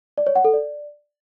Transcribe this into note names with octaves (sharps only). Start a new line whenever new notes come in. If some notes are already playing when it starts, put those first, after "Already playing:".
D5
C#5
F#5
A4
D5